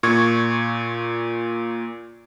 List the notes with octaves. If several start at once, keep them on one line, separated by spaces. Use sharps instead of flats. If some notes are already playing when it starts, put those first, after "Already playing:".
A#2 C#6 G#6